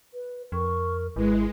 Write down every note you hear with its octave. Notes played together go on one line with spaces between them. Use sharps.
B4
F2 A#4 C#6
G#1 G#3 E4 B4